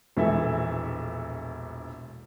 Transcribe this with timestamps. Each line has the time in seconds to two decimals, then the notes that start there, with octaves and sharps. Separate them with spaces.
0.17 E1 A#1 E3 E4 A4 E5